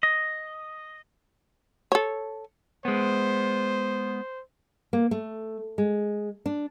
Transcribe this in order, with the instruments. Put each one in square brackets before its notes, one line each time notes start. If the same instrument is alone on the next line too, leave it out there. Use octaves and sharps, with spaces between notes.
[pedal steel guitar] D#5
[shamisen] A4 C#5
[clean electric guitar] G#3 B3 [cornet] C5
[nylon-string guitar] A#3
A3
G#3
D4